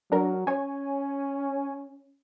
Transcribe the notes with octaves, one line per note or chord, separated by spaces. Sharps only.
F#3 D4 A#4
C#4 C#5 G#5